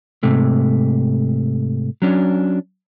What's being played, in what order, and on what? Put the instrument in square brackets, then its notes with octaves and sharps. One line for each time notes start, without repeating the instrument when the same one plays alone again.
[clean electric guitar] G#2 C3 A3
F#3 C#4 D4